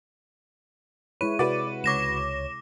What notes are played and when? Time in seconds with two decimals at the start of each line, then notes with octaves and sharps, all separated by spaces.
1.21 G#3 E4 B4 C#5 D#7
1.39 C3 F#4 B4 D5
1.84 C#2 C#5 D6 A#6 E7